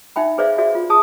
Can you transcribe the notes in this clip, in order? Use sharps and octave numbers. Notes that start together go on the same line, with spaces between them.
D#4 E5 G5 B5
G#4 B4 C5 D5 E5 F5
F#4 G#4 D5 E5
F4
G#4 A5 D#6